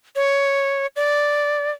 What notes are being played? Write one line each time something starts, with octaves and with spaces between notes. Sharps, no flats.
C#5
D5